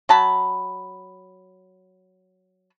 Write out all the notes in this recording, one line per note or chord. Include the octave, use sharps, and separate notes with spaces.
F#3 A5 B5